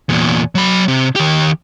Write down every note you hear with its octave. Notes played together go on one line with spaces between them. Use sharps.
E2 A#2
F#3 B5
C3
D#3 G4